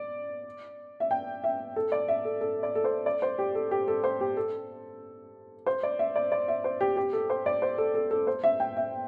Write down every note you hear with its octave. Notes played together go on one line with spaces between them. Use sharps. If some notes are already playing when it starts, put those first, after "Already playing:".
Already playing: D5
E5
G5
E5
A4
D5
E5
A4
A4
D5
A4
C5
D5
C5
G4
A4
G4
A4
C5
G4
A4
C5
D5
E5
D5
D5
E5
C5
G4
G4
A4
C5
D5
C5
A4
A4
A4
C5
E5
G5
E5